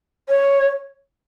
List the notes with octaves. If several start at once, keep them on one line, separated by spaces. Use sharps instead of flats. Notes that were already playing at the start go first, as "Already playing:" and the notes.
C#5